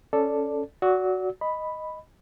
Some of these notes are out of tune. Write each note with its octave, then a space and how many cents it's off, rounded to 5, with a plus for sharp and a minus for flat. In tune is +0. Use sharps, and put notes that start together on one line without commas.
C#4 +0 A4 +0 D5 +0
F#4 +0 D5 -30 E6 -35
D#5 +0 B5 +0